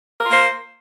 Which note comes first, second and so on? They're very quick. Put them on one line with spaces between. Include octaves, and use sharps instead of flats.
A#4 F4 A#3 C5